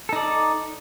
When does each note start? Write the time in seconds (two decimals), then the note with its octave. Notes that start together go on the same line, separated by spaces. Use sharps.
0.09 A4
0.13 D#4
0.16 D5